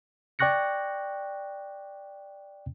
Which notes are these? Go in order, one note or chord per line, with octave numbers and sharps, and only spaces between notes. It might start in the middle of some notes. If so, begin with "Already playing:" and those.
D5 G5 C#6 F#6 A#6 C#7